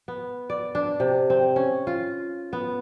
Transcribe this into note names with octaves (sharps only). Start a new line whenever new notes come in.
B3
D5
D4
C3
C4
C#4
F4
B3